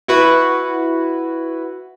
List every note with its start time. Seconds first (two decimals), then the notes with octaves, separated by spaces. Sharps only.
0.08 E4 F#4 B4